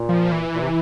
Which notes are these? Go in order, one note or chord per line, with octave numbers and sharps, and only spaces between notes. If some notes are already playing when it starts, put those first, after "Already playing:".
Already playing: A#2
F3
E3
A#2
C3